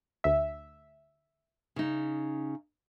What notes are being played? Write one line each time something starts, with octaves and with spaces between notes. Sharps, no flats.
D2 E5
C#3 D#4